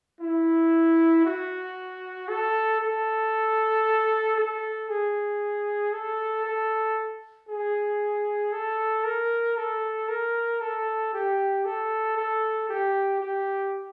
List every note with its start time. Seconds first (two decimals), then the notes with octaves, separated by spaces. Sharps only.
0.21 E4
1.25 F#4
2.28 A4
2.81 A4
4.36 A4
4.89 G#4
5.93 A4
6.45 A4
7.48 G#4
8.53 A4
9.04 A#4
9.57 A4
10.09 A#4
10.61 A4
11.13 G4
11.65 A4
12.17 A4
12.69 G4
13.21 G4